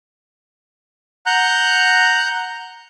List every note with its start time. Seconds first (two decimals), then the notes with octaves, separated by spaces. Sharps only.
1.26 F#5 A#5 F#6 G6